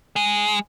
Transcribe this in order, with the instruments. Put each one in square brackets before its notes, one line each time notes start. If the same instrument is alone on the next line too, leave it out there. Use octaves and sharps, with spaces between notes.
[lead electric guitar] G#3